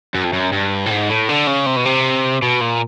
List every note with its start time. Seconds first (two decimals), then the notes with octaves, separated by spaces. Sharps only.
0.15 F#2
0.24 F2
0.33 F#2
0.52 G2
0.86 A2
0.91 G#2
1.09 A2
1.29 D3
1.47 C#3
1.66 C3
1.76 B2
1.85 C3
2.42 B2
2.61 A#2